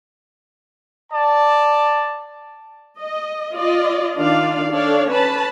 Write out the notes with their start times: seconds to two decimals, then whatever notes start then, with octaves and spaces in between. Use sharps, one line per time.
1.11 D5 A5
3.01 D#5
3.54 F4 D5 D#5
4.17 D#3 D4 F4 D5 F5
4.73 D4 A4 C#5 D5 F5
5.11 C#4 B4 A5 B5